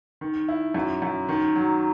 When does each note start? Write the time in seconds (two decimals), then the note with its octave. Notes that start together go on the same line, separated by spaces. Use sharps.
0.21 D#3
0.49 E4
0.74 F#2
1.02 F#2
1.29 D#3
1.56 F#3